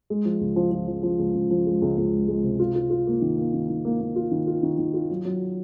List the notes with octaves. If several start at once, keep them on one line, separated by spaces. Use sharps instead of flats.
G#3
F3
C#2
F3
F3
F3
F3
C#2
C#2
F3
G#3
C#2
C#2
G#3
G#3
C3
F4
F4
F4
A#3
D#3
A#3
D#3
D#3
A#3
A#3
F4
D#3
F4
D#3
D#3
F4
F#3
F#3